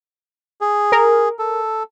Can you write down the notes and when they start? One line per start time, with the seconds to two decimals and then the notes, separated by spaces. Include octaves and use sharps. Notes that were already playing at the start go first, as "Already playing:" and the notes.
0.61 G#4
0.92 A#4
1.39 A4